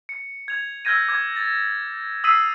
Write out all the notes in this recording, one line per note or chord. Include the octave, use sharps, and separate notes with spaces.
C#7
G#6 F7
E6 F6 G6 G#6 A#6 D#7
D6 G#6
A6
D#6 E6 B6 C7 D#7